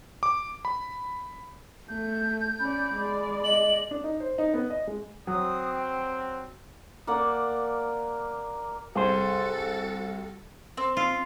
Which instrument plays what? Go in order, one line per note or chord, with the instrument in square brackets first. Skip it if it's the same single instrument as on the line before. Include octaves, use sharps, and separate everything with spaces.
[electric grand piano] D6
B5
[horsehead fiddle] A3 [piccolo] G6
[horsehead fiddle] C#4 D5 [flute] B5
[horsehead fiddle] G#3 D5
[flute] D#5 [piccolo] F#7
[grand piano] D4
D#4
C5
D#4
B3
D#5
G#3
[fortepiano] F#3 [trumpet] C4 [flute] D#6
[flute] G5
[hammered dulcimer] A#3 D5 F#5
[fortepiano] C2 [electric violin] F#4 A4 [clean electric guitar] G#4 C5
[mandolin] C4
[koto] F4